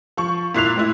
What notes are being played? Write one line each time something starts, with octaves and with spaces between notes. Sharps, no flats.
F3 C#6
A#2 E4 F#6 C7 F7
A2 G#3 E4